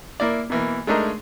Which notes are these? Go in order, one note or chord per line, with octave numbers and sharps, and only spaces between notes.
A#3 E4 D5
B2 E3 A#3
G#3 A3 D4 D#4 G#4 A#4